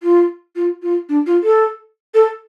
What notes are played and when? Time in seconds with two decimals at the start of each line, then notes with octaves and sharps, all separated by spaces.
0.03 F4
0.56 F4
0.82 F4
1.09 D4
1.26 F4
1.43 A4
2.14 A4